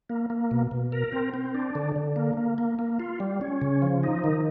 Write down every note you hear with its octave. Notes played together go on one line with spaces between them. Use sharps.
A#3
A#3
B2
B2
A#4
C4
C4
D4
D3
D3
A#3
A#3
A#3
A#3
F4
G3
C#4
C#3
F3
D#4
D#3